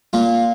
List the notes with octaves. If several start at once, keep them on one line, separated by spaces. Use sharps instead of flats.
A#2 A#3 F4